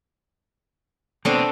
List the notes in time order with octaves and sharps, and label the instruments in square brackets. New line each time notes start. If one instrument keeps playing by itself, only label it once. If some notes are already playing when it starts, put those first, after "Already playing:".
[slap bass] B2 [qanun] C4 D4 A4